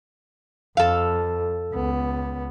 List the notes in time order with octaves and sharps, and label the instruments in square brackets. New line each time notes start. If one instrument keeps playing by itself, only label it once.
[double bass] F2 [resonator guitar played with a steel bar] A4 F5
[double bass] C#2 B3